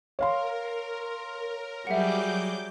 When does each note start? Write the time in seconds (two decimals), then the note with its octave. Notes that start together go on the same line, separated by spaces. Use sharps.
0.19 A#4 C#5 F5 C6
1.87 F#3 G3 G#4 E5 F#5 D6 G6